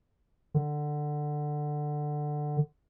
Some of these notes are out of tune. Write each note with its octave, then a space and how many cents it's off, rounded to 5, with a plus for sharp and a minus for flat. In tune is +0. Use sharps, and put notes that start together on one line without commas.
D3 +15